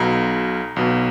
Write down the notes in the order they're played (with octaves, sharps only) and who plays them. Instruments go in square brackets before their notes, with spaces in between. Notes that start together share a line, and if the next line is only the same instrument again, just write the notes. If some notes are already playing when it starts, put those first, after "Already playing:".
Already playing: [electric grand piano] B1 B2 A#5
B1 B2